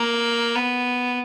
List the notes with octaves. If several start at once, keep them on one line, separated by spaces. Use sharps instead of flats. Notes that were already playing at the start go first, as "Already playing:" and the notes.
Already playing: A#3
B3